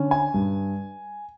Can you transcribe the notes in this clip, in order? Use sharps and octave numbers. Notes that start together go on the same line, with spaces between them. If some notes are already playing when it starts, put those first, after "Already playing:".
Already playing: D3 C#4
G#5
G2